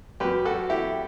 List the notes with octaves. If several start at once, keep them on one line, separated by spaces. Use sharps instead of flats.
F#2 F#3 G4 B4
F#4 A4
E4 G4